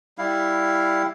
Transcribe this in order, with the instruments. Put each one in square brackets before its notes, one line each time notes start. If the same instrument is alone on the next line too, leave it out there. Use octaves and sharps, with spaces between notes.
[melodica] G3 E4 F5